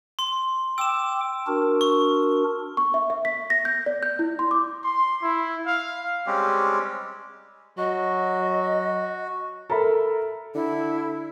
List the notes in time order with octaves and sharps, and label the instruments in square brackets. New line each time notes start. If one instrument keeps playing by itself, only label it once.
[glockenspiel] C6
[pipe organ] G5 D6 [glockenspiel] E6 E7
[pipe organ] D4 F#4 A#4
[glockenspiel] C#6
[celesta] C#6
E5
E5
B6
A#6
G6
D5
G6
E4
C6
D6
[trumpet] C6
E4
F5
[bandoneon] G3 G#3 C4 C#4 G4
[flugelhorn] F#3 [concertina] F#4 [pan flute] D#5
[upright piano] A4 A#4 E5 A#5 B5
[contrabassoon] D3 [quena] E4